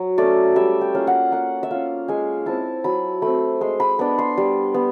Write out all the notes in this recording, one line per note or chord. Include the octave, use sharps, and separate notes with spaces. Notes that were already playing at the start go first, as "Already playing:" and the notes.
Already playing: F#3
A3 C#4 D5
G3 E5
G5
A#3 C#4 F4
F#5
A#3 F#5
E5
C#4 F4 F5
G#3 G#5
C4 E4 A5
F#3 B5
A3 C4 B5
G#3 C6
B5
B3 D4 B5
C6
G3
B3